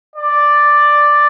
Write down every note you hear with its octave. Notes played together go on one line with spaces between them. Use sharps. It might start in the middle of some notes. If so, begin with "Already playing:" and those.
D5